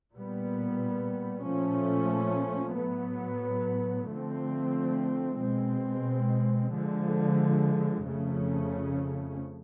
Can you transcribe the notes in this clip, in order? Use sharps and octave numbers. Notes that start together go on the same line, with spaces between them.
A#2 G3 B3
A#2 F3 A3 C#4
A2 F#3 B3
D3 F3 A3 C4
B2 G#3 C4
D3 F3 G#3
F2 C#3 F3 A3 C#4